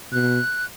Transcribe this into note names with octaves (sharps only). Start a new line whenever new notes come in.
B2 F#6